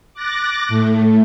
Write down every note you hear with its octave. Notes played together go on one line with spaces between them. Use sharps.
D6 F#6 A6 A#6
A2 A3